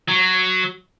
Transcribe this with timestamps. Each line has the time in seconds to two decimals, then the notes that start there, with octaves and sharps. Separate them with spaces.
0.08 F#3